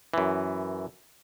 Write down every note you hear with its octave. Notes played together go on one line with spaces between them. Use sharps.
F#2 E3